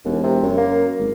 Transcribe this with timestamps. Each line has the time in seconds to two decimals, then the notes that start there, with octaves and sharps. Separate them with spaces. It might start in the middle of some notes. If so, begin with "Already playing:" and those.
0.05 E1 D#2
0.23 C3
0.43 F#2
0.57 A#3
1.00 G#1